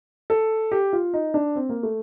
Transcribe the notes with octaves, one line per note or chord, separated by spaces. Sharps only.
A4
G4
F4
D#4
D4
C4
A#3
A3